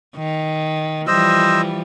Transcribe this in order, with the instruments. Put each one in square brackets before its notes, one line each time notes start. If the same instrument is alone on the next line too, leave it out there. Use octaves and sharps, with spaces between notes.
[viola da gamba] D#3
[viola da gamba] E3 F3 G3 [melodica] C5 D#5 E6